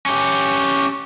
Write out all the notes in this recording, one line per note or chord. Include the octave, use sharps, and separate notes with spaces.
C#4 G4